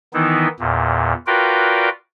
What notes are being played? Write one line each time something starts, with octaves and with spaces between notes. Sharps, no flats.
D#3 E3 B3 D#4 E4
E2 A#2
F4 F#4 A#4 B4 D5 G5